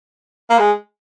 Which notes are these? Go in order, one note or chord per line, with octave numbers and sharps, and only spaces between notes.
A#3
G#3